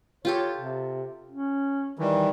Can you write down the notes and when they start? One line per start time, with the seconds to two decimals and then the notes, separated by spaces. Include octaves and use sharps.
0.25 F4 G4 A4 C#5
0.56 C3
1.30 C#4
1.99 D#3 E3 G3